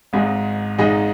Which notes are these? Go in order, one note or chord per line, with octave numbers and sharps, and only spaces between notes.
G#1 G#2 G#3 D#4
G#1 G#2 G#3 D#4